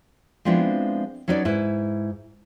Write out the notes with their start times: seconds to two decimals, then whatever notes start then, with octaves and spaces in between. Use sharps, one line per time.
0.45 F3 G#3 B3 C4 D4 E4
1.28 F#3 C#4 D#4 B4 C#5 D5
1.45 G#2 E4 B4